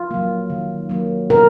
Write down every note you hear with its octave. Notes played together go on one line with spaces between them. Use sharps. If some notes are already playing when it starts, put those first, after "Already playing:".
Already playing: F4
F#3 A#3
D#3
F#3 A#3
B2 A#4